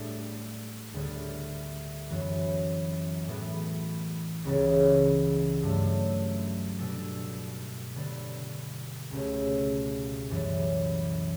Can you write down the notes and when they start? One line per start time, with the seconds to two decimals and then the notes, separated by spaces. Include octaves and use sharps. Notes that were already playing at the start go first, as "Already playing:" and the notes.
Already playing: A2 G3 D4 A4
0.94 D2 D3 G3 B3
2.09 F#2 E3 B3 F#4
3.28 A2 E3 B3 F#4
4.45 C#2 C#3 E3 G3 C#4
5.62 G2 F#3 A3 E4
6.79 B2 G3 D4 A4
7.96 D3 G3 B3
9.11 C#2 B2 A3 C#4 G4
10.30 F#2 E3 G3